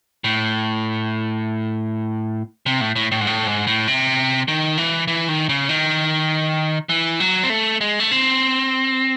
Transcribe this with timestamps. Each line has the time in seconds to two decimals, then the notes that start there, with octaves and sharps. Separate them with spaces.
0.24 A2
2.66 C3
2.81 A2
2.96 A2
3.11 A2
3.21 G#2
3.27 A2
3.47 G#2
3.67 A2
3.87 C3
4.48 D#3
4.78 E3
5.08 E3
5.29 D#3
5.49 C#3
5.69 D#3
6.89 E3
7.20 F#3
7.43 C4
7.50 A3
7.81 G#3
8.00 A3
8.11 C4